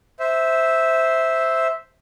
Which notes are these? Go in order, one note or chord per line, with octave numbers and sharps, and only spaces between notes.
C5 E5